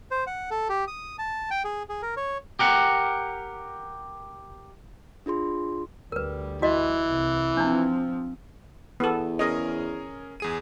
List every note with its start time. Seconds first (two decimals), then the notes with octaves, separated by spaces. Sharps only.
0.11 C5
0.27 F#5
0.51 A4
0.69 G4
0.87 D#6
1.19 A5
1.51 G5
1.65 G#4
1.89 G#4
2.02 A#4
2.17 C#5
2.59 G4 A#4 F#5
5.26 D4 F4 G#4 C6
6.12 D2 G3 A#4 B4
6.62 E3 F#4 D#5
7.08 C2
7.57 F3 C4 D4 D#4
9.00 E2 B3 A4
9.39 C#4 G#4 A#4 D#5
10.40 E2 G#4 D#7